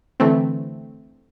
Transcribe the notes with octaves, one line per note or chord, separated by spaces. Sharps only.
D3 E3 A3 C4